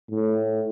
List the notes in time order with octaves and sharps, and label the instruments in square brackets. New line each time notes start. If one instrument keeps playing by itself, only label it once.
[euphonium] A2